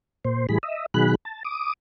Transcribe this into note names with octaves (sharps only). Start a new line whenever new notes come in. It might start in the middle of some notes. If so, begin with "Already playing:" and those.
A#2 C5
A2 E3 G3 G#4 B5
D#5 E5
B2 D#3 F#3 G#4 B5 F#6
A5
D6 D#6